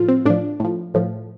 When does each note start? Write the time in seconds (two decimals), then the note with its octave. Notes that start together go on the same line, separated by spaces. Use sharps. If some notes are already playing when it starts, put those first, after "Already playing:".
Already playing: A2 F3 F4
0.08 C4
0.25 A2 F3 D4
0.60 A2 F3
0.94 A2 F3